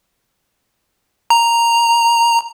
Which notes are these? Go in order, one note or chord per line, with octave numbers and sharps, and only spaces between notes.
A#5